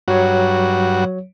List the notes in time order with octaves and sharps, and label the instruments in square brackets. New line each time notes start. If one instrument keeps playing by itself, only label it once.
[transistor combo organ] G2 F#4 [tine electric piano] F#3 C#5